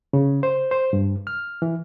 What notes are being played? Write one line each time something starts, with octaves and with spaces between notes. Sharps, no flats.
C#3
C5
C5
G2
F6
E3